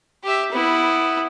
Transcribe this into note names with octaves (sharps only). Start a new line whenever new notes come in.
G4 E5
B3 E4